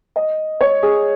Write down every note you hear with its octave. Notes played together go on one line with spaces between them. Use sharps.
D#5
C#5
G#4